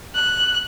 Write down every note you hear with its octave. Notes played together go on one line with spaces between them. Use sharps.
F#6